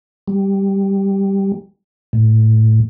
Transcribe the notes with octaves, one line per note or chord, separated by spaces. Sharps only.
G3
A2